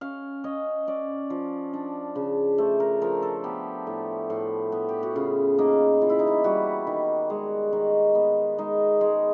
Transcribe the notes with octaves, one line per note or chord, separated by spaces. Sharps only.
C#4 F5
C#4 D#5
C#4 D5
F3
D4
C#3
A3 C5
A#4
F3 A#4
A4
B3 G4
A2
A2
B3
G4
F#4
C#3 F4
A#3 D#4
E3 F4
E4
D#4
E4
G3 F#4
D#3
G#3
D#3
B3
G#3 D#4
G#3